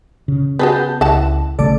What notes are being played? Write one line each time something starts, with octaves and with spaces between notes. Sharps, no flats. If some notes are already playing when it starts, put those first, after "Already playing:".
C#3
B3 F#4 G#4 B4 A5 G6
C#2 E3 F#5 A5
G#1 C#3 A3 A4 D5 D6